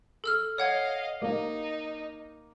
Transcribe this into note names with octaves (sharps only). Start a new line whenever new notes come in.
A4 E6 F6
C#5 D#5 F5 F#5 G#6
A#3 D#4